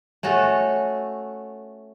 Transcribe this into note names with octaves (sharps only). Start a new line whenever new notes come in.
A3 C#4 F#4 A4